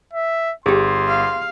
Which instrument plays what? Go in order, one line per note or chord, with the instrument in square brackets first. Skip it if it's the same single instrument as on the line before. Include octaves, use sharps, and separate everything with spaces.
[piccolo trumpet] E5
[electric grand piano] G1 [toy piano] G4 G#4 [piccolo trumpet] C6
[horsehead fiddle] F5